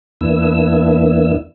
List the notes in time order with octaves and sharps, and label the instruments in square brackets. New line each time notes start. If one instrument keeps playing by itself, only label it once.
[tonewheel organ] E2 A#3 B3 D4 E4 E6